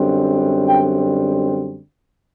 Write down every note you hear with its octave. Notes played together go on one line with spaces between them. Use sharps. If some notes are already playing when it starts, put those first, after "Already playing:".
Already playing: F#2 D3 G3 C4
G5